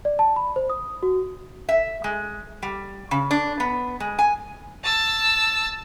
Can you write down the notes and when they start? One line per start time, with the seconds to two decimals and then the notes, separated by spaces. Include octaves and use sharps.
0.05 D5
0.19 A5
0.36 B5
0.56 C5
0.70 D#6
1.03 F#4
1.69 E5
2.04 G#3
2.63 G3
3.11 C#3
3.31 D4
3.60 B3
4.00 G#3
4.19 G#5
4.84 A5 E6